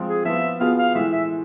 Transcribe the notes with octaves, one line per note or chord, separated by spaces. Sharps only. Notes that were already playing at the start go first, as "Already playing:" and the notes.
Already playing: F3 G#3 C4 F4
G#4
F3 B3 F4 E5
B2 B3 F4 G#4 F5
F5
A2 E3 G#3 E5
E5